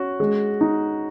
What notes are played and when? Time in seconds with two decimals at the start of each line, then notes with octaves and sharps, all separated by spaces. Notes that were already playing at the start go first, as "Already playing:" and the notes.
Already playing: C#4 F#4
0.20 G#3
0.61 D#4